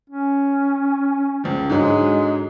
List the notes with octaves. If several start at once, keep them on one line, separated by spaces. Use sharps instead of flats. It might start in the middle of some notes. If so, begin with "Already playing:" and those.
C#4
C#2 F3
G#2 D3 F#3 G#3